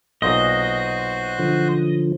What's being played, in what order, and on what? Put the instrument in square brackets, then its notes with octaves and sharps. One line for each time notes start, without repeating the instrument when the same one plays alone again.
[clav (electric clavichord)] B1 A#2 [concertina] F#4 C5 F#6 [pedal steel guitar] D#5
[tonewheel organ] D3 F3